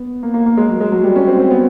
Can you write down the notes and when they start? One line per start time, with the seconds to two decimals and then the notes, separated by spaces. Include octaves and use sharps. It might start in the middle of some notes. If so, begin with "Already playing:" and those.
Already playing: B3
0.23 A#3
0.34 A#3
0.46 A#3
0.57 G#3
0.69 F#3
0.81 G#3
0.92 F#3
1.04 G3
1.16 C#4
1.27 C4
1.39 C4
1.50 B3